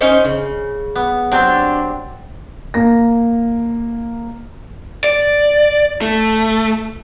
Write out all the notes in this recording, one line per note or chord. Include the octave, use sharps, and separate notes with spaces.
C#4 D#4 C5
C#3
B3
F#3 C4 D4 G4
A#3 A#6
D5
A3